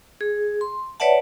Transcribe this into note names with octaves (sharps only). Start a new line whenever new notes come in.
G#4
C6
B4 C#5 D5 E5 F#5 A5